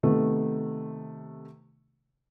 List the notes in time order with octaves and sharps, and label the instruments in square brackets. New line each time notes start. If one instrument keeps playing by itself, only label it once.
[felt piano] C3 D#3 A3 B3